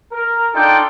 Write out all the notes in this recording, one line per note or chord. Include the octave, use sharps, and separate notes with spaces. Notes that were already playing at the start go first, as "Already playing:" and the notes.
A#4
D4 D#4 F4 A4 D5 G5